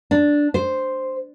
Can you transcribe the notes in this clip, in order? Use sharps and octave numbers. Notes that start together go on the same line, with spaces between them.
D4
C5